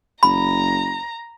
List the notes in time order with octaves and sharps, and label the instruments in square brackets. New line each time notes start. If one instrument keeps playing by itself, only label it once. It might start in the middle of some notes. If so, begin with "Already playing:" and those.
[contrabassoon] F#1 [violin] A#5 [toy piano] B5